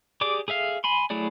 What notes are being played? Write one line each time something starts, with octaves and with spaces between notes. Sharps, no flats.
G4 G#4 D5 D6
G#4 A4 E5 F5
G#5 B5 C6
F#3 A3 E4 G#4 D5